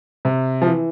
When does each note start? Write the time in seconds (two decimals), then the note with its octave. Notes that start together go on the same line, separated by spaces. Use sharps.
0.25 C3
0.62 F3
0.66 E3